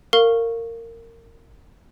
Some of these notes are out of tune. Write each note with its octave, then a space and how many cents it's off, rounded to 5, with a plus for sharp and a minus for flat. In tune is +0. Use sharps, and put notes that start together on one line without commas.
A#4 -20 F5 +0 C#6 -5